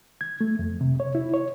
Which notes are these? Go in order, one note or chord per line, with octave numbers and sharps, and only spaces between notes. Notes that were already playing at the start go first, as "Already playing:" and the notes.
G#6
A3
F2
C3
C#5
E4
C#5